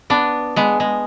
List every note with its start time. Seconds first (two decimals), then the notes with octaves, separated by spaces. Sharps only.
0.10 B3 D4
0.56 G#3 B3
0.80 G#3